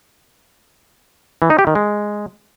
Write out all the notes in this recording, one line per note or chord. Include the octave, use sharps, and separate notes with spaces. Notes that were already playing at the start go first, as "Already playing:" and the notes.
E3
D#4
G4
D#3
G#3